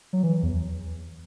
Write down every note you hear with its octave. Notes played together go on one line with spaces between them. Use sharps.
F#3
E3
E2